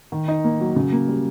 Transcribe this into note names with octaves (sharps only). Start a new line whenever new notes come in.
D#3
D#4
A#3
F#3
C#3
A#3
G3